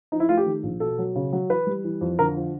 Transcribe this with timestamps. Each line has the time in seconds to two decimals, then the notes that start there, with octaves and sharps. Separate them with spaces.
0.12 F3 D#4
0.20 E4
0.28 A3 F4
0.37 G4
0.46 D#3
0.63 A#1
0.80 B2 A4
0.98 F#3
1.15 C#3
1.33 F#3
1.50 E3 B4
1.67 G3
1.84 E3
2.01 F2
2.19 D3 A#4
2.36 F3